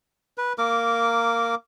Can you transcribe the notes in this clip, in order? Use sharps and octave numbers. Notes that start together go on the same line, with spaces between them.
B4
A#3 A#4 D6